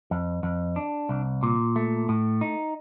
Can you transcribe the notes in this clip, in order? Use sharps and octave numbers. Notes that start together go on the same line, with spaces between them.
F2
F2
D4
C2
A#2
A3
A2
D#4